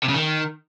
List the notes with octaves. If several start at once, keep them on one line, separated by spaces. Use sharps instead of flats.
C3
C#3
D#3